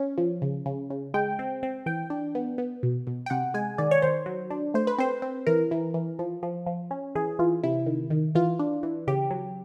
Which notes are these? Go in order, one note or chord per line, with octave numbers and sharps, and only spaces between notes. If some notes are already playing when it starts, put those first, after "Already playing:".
Already playing: C#4
F3
C#3
C#3
C#3
G#3 G5
C4
C4
E3 G5
D4
B3
B3
B2
B2
G5
C3 F#5
G#3 G#5
D#3 D5
C#5
D#3 C5
F#3
D4
A3 C5
B4
C4 C5
C4
E3 A#4
E3
E3
F3
F3
F3
C#4
E3 G#4
E3 F4
C3 E4
D#3
D#3
E3 F4
D4
E3
C#3 G4
F#3